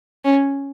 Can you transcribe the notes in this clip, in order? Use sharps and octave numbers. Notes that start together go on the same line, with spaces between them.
C#4